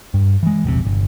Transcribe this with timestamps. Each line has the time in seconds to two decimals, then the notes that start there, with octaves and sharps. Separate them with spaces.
0.14 G2
0.43 E3 G#3
0.64 E1 A#1 A2 C3
0.85 G1